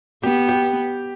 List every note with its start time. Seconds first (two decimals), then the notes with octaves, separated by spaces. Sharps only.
0.23 B3 G4
0.49 G4